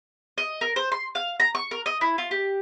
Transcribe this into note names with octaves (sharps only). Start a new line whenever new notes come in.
D#5
A#4
C5
C6
F5
A#5
C#6
A#4
D#5
E4
F4
G4